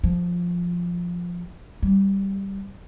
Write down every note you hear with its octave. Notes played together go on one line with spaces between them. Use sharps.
F3
G3